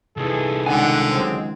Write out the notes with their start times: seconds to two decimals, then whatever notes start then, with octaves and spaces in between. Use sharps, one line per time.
0.17 C2 E3 D#4 G#4 A4
0.66 C#2 D3 D#3 F#5 G#5
1.11 F#3 G#3 C4